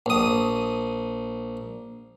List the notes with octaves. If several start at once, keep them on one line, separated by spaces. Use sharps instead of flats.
A#1 D#6